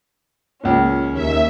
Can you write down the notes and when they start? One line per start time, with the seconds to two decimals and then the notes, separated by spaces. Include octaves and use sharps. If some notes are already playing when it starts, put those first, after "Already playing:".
0.64 C#2 A#2 C#4
1.11 D#2 E5